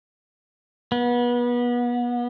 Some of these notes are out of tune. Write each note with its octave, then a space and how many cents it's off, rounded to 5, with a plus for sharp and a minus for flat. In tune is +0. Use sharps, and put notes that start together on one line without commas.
B3 -30